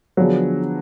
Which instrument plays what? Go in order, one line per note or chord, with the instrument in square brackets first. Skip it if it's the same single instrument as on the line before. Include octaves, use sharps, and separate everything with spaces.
[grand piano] D3 F3 B3 D4 G#4 [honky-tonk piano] F#3